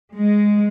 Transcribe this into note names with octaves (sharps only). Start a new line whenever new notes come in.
G#3